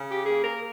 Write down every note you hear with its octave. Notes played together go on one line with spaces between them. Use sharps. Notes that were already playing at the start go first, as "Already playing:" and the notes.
Already playing: C#3
G4
A#3 G#4
A#4